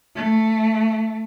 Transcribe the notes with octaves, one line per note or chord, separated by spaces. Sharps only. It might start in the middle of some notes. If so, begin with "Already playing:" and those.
A3